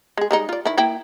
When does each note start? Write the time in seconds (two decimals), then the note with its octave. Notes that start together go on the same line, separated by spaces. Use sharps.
0.17 G#3 G#4
0.31 G3 G#3 D#4
0.49 F4 D5
0.65 D#3 E4
0.78 A#3 E4 G5